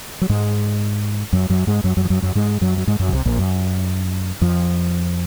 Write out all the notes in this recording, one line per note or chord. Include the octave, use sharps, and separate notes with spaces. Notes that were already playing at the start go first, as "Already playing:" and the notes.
F#3
G#2 G#3
F#2 F#3
F#2 F#3
G#2 G#3
F#2 F#3
F#2 F#3
F3
F#2 F#3
F#2 F#3
G#2 G#3
F#2 F#3
F#3
G#2 G#3
F#2 F#3
C#3
C2 C3
A#1 A#2
F#2
F2 F3